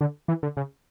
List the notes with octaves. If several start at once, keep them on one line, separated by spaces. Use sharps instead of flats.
D3
E3
D3
C#3